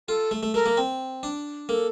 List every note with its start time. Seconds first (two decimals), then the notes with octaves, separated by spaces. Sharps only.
0.08 F4 A4
0.31 A3
0.43 A3
0.54 A3 A#4
0.66 A#3
0.77 C4
1.23 D4
1.69 A#3 A4